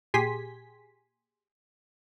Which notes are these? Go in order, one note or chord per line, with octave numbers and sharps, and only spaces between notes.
A#2 G4 G#4 G#5 C6 B6